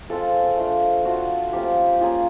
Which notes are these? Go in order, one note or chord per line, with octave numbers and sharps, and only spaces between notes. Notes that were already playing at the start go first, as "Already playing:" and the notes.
F3 G#3 C4 F4 A4
A3 D4 F4
A3 D4 F4 F#4
F3 A#3 C#4 F4 G4
A#3 C#4 F4 G#4